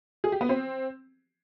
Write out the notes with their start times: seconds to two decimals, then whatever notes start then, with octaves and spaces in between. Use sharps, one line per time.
0.24 G#4
0.32 G4
0.41 B3
0.49 C4